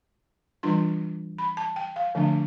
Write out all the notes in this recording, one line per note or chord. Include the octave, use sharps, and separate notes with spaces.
E3 G3 D4 F4 C6
B5
A5
G5
F5
D3 F3 A3 D4